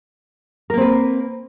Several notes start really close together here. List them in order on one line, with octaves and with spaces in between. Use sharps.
A#4 A#3 C4 B4